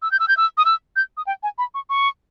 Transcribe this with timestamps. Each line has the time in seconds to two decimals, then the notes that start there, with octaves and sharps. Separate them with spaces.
0.02 E6
0.12 G6
0.20 E6
0.28 G6
0.37 E6
0.57 D#6
0.65 E6
0.96 G6
1.17 D#6
1.27 G5
1.43 G#5
1.58 B5
1.74 C#6
1.90 C#6